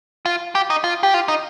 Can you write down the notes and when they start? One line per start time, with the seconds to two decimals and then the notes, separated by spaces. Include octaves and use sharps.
0.26 F4
0.55 G4
0.70 D#4
0.84 F4
1.03 G4
1.14 F4
1.28 D#4